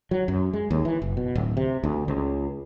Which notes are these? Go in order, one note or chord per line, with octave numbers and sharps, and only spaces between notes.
F#3
F#2
G#3
D#2
E3
F#1
B2
D1
C3
D2
C#2